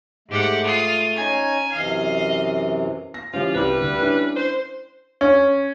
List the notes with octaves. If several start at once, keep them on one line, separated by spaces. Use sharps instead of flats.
G#2 A3 G4 F#5
F4 D#6
C#4 D#4 G#5 A#5
F#2 C3 E3 D#5 F5
A#6
E3 F3 G3 C#4 F4
C2 G3 G4 B4
D2
C#4 D4 E4
C5
C#4